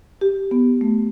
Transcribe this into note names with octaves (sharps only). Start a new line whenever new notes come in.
G4
B3
A3